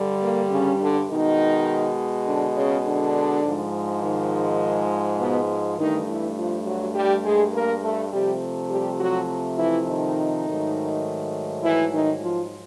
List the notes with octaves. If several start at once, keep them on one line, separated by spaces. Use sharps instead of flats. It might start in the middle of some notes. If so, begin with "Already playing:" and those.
Already playing: G2 D3 G3
A#3
C#3 C#4
D3 D4
B2 D#3 G#3 D#4
D3 D4
C#3 C#4
D3 D4
G#2 F3 G#3
D#3 D#4
B2 B3
G2 D#3 E3 A3 D#4
E3 E4
F3 F4
F#3 F#4
G3 G4
G#3 G#4
A#3 A#4
A3 A4
C3 F3 G3 A3 G4
G3 G4
F#3 F#4
E3 E4
D#3 D#4
G#2 D#3 F#3 A3
E3 E4
D#3 D#4
F3 F4